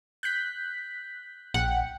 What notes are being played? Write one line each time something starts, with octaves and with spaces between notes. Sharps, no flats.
F#6 G6 B6
A#1 F#5 G5